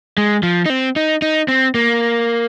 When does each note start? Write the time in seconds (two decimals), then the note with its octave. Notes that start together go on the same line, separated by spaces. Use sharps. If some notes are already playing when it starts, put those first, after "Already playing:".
0.18 G#3
0.43 F3
0.66 D#4
0.70 C4
0.96 D#4
1.22 D#4
1.48 C4
1.75 A#3